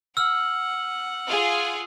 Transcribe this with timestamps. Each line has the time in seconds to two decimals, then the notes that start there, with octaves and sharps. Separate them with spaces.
0.17 F#5 E6 F6
1.28 F4 G#4